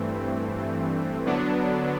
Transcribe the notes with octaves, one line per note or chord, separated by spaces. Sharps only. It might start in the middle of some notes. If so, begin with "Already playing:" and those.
Already playing: G2 E3 A3 C4
D3 F#3 B3 D4